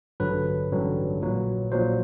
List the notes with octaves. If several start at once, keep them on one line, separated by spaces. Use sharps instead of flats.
A1 G2 D3 F#3 B4
A1 G2 D3 F#3
A#1 A#2 F#3
A#1 A#2 F#3 C5